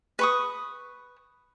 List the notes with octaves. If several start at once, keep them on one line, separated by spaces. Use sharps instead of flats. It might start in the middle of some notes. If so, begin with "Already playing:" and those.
B4 C#6 D#6